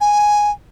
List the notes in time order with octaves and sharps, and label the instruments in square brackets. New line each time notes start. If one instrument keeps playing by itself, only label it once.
[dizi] G#5